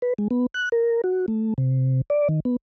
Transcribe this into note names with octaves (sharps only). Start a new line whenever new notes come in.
B4
G#3
B3
F#6
A#4
F#4
A3
C3
D5
D#3
B3